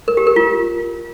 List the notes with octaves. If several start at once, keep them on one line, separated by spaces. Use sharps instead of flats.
A#4
G4
A#4
F4